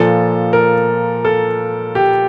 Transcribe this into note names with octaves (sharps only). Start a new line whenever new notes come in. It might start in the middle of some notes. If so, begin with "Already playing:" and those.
Already playing: A#2 F3 A4
A#4
A4
G4